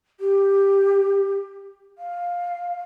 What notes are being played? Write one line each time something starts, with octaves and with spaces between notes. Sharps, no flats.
G4
F5